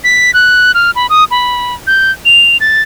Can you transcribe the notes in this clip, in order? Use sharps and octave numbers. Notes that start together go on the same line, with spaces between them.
B6
F#6
F6
B5
D#6
B5
G6
F7
A6